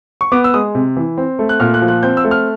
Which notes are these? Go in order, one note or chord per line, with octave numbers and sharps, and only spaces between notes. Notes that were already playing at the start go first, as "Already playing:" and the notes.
C#6
B3 D6
E6
G#3 D#6
C3
E3
C4
A3
F#6
A#2 F6
F#6
F3
F#6
C4 G6
E6
A3
F6